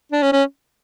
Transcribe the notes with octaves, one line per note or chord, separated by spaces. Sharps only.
D4
C#4
C#4